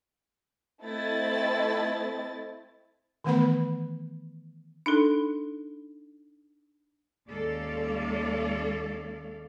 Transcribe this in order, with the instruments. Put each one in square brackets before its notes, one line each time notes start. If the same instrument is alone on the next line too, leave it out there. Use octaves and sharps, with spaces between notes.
[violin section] A3 C4 E4 D#5 A6
[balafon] D#3 E3 A3 B3 B4 B5
[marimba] D4 D#4 A4
[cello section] D#2 G#3 C#4 A4 D5 F5